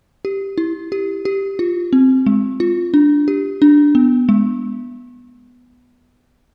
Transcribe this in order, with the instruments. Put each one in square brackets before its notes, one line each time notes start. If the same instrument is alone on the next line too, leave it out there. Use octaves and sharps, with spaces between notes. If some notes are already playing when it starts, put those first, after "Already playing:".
[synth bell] G4
E4
G4
G4
F4
C4
G#3
F4
D4
G4
D4
B3
G#3